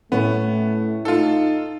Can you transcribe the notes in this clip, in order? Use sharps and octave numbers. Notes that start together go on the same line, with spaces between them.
A2 A3 B3 C#4
D#4 F4 A4